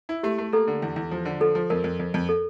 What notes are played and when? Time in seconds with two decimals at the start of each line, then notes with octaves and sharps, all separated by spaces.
0.09 E4
0.23 A3 G4
0.38 A3
0.52 A#3 A4
0.67 D3
0.82 E2
0.96 E2
1.11 F3
1.25 D3
1.40 F3 A4
1.55 F3
1.70 F2 A#4
1.84 F2
1.99 F2
2.14 F2
2.29 A4